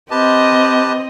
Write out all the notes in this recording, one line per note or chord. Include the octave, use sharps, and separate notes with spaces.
C4 G4 B4 D#5 A5